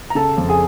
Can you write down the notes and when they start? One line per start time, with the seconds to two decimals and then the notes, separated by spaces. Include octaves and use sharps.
0.10 A#5
0.15 C#3 A4 A5
0.38 F2
0.49 G#4 G#5